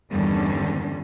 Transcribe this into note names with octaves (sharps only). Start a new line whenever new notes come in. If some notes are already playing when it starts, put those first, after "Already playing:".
E2 G2 D3 D#3 G3 C#4